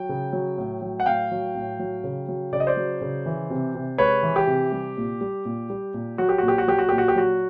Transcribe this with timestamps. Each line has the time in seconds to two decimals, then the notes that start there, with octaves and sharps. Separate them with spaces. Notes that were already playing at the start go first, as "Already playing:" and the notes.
Already playing: F#3 G5
0.09 C#3
0.33 F#3
0.58 A2
0.82 F#3
1.00 F#5
1.06 A2 F5 G5
1.31 F#3
1.55 A2
1.79 F#3
2.04 C#3
2.28 F#3
2.53 C#3 D5
2.60 D#5
2.67 C5 D5
2.77 F#3
3.01 C#3
3.26 E3
3.50 C3
3.75 C3
3.98 G#3 B4 C#5
4.23 E3
4.36 G4
4.47 C3
4.72 G3
4.97 A#2
5.21 G3
5.45 A#2
5.70 G3
5.94 A#2
6.18 F#3 F#4
6.29 G4
6.38 A#2 F#4
6.48 G4
6.58 F#4
6.68 F#3 G4
6.79 F#4
6.89 A#2 G4
6.98 F#4
7.08 G4
7.15 F#3 F#4